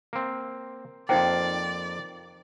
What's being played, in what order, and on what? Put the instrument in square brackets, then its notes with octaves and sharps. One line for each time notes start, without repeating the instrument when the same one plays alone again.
[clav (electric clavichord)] A#3 C4
[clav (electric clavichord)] F2 A#3 [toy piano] D#4 C5 G5 [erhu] D5